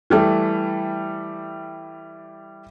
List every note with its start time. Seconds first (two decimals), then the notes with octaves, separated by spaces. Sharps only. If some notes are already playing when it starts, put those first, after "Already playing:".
0.10 E3 G3 A3